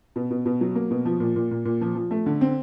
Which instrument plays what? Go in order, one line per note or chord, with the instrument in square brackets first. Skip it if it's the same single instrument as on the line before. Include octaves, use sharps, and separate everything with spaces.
[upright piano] B2
B2
B2
F#3
A#3
B2
F3
A#2
A#2
A#2
A#2
F3
F3
A3
D3
C4